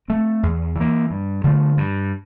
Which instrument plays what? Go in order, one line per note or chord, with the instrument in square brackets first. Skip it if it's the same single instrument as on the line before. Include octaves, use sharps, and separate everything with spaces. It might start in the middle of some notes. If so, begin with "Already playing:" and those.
[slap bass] A3 C4
E2
E3 A#3
G2
D3 F3 A3
G2